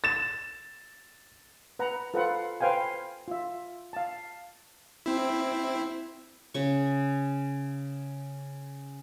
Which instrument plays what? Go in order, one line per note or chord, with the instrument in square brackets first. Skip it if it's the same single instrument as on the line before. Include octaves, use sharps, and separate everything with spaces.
[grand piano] A6 E7
[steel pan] B4 F#5 A#5
F4 A4 B4 C5 F5 F#5
B4 C5 F5 G5 G#5
F4 E5
F5 A5
[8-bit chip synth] C4 E4
[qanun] C#3 C#6